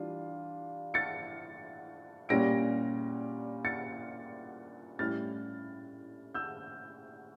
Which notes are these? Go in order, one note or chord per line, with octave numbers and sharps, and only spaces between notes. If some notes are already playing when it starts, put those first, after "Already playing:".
Already playing: E3 G3 D4 F4
A6 C#7
A#2 G3 C#4 A#6 D7
A6 C#7
A2 G3 C#4 E4 F6 A6
E6 G6